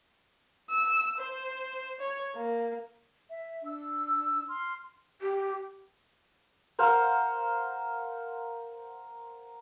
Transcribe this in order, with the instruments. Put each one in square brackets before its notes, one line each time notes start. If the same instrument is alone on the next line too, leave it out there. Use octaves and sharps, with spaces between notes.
[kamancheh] E6
C5
C#5
A#3
[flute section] E5
D4 E6
C6 F6
[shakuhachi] G4
[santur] A#4 C5 F5 F#5